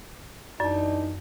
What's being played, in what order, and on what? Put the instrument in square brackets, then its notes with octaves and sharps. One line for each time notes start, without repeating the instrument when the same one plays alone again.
[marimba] F#2 [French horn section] E3 D4 D#4 [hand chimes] D5 A5